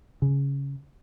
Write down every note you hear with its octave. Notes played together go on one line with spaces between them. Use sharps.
C#3